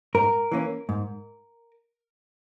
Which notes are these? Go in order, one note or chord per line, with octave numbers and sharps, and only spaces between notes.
G#2 A#4
E3 A#3 C#4
G#2